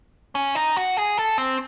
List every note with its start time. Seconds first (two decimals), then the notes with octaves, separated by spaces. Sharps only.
0.35 C#4
0.55 D#4
0.76 F#4
0.97 G#4
1.18 A4
1.38 C4